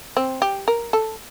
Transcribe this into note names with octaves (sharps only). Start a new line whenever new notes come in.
C4
G4
A#4
A4